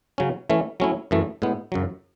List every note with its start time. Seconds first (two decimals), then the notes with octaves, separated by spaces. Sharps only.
0.18 C#3 F#3 C#4
0.50 E3 A3 C#4
0.80 F#3 A3 C#4 E4
1.11 F#2 E3 A3
1.42 A2 G#3 B3
1.72 F#2 C#3 F#3